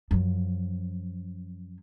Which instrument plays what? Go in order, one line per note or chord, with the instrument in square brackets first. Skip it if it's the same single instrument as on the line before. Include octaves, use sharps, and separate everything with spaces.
[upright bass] F#2 F3